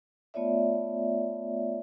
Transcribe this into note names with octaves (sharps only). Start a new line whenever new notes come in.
A3 B3 F4 C#5 D5 E5